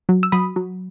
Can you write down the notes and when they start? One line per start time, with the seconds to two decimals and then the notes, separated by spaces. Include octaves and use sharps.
0.09 F#3
0.23 E6
0.32 F#3 B5 D#6
0.56 F#3